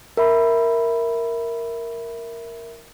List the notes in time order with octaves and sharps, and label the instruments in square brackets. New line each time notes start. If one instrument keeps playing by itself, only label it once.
[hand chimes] A#4 E5 B5